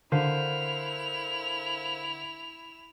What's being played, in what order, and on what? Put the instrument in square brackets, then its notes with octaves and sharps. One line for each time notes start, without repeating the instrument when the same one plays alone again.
[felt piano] D3 [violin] E4 F7 [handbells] A#4 C5 F5